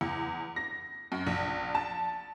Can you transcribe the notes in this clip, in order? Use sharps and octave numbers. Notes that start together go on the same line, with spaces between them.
E2
A#6
F#2
A#1
A5